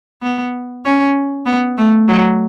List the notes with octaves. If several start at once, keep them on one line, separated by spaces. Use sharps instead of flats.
B3
C#4
B3
A3
F#3